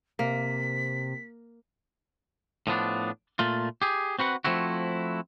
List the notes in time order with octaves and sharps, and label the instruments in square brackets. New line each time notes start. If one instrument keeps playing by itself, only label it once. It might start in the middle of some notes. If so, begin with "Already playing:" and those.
[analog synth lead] C3 [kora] A#3 [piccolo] B6
[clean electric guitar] A2 F3 B3 D4
A#2 A3 F4
G4 G#4
C4 F#4 B4 F#5
F3 A3 C4 E4 F#4